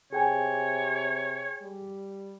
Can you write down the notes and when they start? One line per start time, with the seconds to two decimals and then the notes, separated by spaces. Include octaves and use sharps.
0.13 C3 G#4 C#5 G5 G#5
1.62 G3